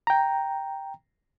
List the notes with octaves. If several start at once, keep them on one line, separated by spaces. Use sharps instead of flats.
G5 A#5